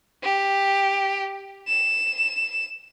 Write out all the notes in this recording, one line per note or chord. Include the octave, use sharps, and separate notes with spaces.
G4
E7